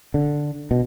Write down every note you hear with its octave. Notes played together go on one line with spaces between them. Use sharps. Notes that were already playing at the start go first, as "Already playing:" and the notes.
D3
B2